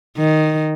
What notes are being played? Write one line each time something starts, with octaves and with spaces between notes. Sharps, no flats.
D#3